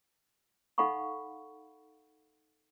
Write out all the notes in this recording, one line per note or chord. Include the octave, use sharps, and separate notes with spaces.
D#4 A4 F5 F#5 B5 C#6